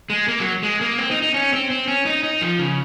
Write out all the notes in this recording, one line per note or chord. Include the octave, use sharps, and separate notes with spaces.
G#3
A#3
F#3
G#3
A#3
C4
D#4
D#4
C#4
C4
C4
C#4
D#4
D#4
F3
C#3